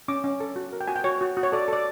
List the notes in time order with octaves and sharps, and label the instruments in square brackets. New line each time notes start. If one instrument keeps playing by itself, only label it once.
[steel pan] C#4 D6
C#4
A4
F#4
A#4
G5
F#4 G#5
G5
F#4 C#5
F#4
F#4
C#5
A4 D5
A4 D5